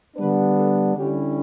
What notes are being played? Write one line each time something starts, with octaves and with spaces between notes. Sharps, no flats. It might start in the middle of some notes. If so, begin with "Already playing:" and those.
D3 G3 B3 D4 B4
A4
D3 G3 C#4 E4 G4